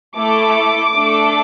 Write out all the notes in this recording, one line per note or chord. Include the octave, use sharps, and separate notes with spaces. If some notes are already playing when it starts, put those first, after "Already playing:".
A3 E4 A4 D6
A3 D4 A4